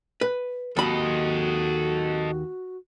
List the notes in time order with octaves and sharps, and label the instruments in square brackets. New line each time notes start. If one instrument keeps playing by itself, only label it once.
[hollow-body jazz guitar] B4
[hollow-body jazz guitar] D#2 B5 [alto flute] F#4 [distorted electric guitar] A4 D#5